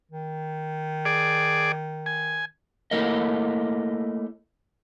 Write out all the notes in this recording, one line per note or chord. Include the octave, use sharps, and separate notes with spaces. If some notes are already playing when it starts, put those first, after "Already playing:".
D#3
G#4 D5
G#5
A3 A#3 E4 A#4 C#5 D#5